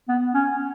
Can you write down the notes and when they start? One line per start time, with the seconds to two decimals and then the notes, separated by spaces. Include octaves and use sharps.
0.08 B3
0.34 C#4